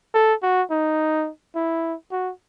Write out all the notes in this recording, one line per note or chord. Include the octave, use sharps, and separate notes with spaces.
A4
F#4
D#4
E4
F#4